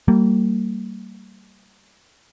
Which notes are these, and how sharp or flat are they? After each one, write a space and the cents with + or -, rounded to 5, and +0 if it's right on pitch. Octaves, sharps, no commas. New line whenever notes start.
G3 -25 A#3 -35